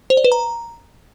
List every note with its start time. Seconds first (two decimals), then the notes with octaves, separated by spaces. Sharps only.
0.10 C5
0.17 D5
0.24 B4
0.32 A#5